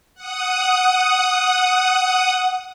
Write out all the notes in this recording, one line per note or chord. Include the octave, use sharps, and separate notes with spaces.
F#5 D#6